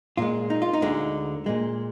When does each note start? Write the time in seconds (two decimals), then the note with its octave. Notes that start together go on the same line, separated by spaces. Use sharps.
0.17 A#2 G#3 F4
0.50 D#4
0.62 F4
0.73 D#4
0.82 D2 D3 G#3
1.46 A#2 G#3